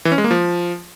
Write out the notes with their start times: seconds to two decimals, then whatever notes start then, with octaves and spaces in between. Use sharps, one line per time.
0.05 E3
0.12 C#4
0.18 G#3
0.24 A#3
0.31 F3